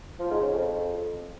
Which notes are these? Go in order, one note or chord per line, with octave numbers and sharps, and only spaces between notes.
F3
G#2
C#3
F2